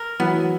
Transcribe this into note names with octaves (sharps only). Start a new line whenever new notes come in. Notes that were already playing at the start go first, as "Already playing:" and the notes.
Already playing: A#4
E3 F#3 B3